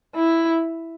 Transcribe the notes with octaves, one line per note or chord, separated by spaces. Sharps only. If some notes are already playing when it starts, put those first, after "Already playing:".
E4